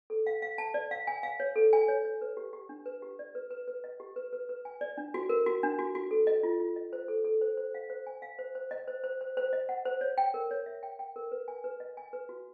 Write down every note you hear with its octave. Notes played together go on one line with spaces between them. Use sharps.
A4
F5
F5
A5
D5
F5
G#5
F5
C#5
A4
G#5
C#5
C#5
B4
G4
G4
D4
B4
G4
D5
B4
B4
B4
D#5
G4
B4
B4
B4
G#5
D5
D4
F#4
A#4
F#4
D4
F#4
F#4
A4
D#5
F4
F4
D#5
C5
A4
A4
C5
C5
F5
C5
G#5
F5
C5
C5
D#5
C5
C5
C5
C5
D#5
F#5
C5
C#5
G5
A#4
C#5
E5
G5
G5
A#4
B4
G#5
B4
D#5
G#5
B4
F#4